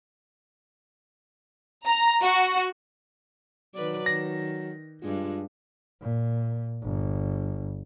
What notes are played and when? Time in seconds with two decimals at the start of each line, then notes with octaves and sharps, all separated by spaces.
1.85 A#5
2.22 F#4
3.75 D#3 F#3 B4 D5
4.06 D#3 A#6
5.02 G2 G#3 F4
6.02 A#2
6.83 G1